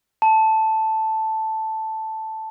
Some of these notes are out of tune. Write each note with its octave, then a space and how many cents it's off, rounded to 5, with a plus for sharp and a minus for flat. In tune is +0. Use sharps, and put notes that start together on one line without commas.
A5 +0